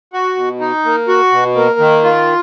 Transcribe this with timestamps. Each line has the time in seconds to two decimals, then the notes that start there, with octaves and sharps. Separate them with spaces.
0.13 F#4
0.36 B2
0.60 D#4
0.85 A#3
1.08 F#4
1.32 B2
1.55 A#3
1.79 D#3
2.04 F4